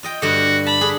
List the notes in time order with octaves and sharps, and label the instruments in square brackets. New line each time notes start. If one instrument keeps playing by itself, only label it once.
[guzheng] F4 D#5 G5
[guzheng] G2 D3 [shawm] F#4
[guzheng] A5 [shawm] B5
[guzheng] D4 G#4